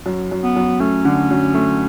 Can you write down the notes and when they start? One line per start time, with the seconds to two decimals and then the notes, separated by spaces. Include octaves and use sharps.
0.06 F#2
0.31 F#2
0.43 B3
0.56 F#2
0.80 A3 C#4
1.05 D3
1.30 F#2
1.54 A3